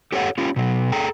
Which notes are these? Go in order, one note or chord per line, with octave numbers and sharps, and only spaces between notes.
G4 A4 C#5 F5 F#5
C#4 F4 G4
B2 F#3
G#4 A4 G5 A#5